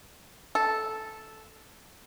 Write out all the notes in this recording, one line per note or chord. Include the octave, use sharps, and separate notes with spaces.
A4